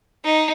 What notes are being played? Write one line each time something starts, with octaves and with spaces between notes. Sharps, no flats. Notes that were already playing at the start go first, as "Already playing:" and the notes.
D#4